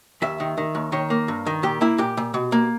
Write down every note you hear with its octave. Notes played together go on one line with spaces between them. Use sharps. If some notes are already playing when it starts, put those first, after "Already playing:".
D#2 E5
D#3
D#3
D#2
D#3 C#5
A#3
G2
D#3
A#2 G4
A#3 E4
A#2 G4
A#2
B2
A#3